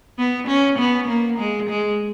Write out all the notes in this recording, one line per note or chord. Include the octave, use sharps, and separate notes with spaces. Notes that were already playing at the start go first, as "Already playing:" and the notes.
B3
C#4
B3
A#3
G#3
G#3